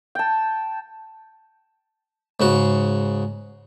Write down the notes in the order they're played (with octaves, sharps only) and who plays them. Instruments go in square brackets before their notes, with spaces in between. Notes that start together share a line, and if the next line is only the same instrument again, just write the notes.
[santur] G5 A5
[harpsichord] G#2 C#3 F#4